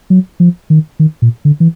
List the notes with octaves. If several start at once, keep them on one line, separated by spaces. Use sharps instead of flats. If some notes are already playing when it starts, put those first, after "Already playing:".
F#3
F3
D#3
D#3
A#2
D3
E3